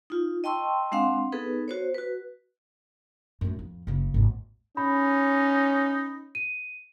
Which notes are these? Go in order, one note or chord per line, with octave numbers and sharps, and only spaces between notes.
D#4 F4
D#5 G5 A5 C6 C#6 E6
G#3 C4 D4 F5 F#5 C6
B3 D#4 G#4 A4 B4
F#4 C5 C#5
F#4 B4
F#2 A2
F2
F#1 C#3
G#1 D#2
C#4 D#4 B5
D#7